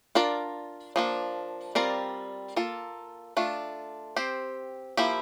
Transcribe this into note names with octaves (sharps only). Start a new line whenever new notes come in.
D4 F4 A#4 D5
F3 A#3 D4
G3 C4 F4 A#4 D5
A#3 F4 A4
A3 D4 F4
C4 G4 C5
F3 A#3 E4 G4